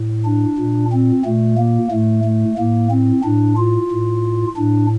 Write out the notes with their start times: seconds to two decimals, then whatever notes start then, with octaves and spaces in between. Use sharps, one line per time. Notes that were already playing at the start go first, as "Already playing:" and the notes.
Already playing: A2
0.26 D4
0.58 A#2
0.93 C4
1.25 A#2 A3
1.58 A#3
1.91 A2 A3
2.25 A3
2.58 A2 A#3
2.91 C4
3.24 A2 D4
3.58 F4
3.91 A2
4.57 A2 D4